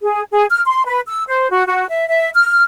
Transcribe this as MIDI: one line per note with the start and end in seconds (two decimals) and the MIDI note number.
0.01 0.22 68
0.32 0.45 68
0.50 0.62 89
0.65 0.83 84
0.86 1.00 71
1.07 1.23 88
1.27 1.49 72
1.50 1.63 66
1.67 1.85 66
1.89 2.05 76
2.09 2.30 76
2.35 2.63 89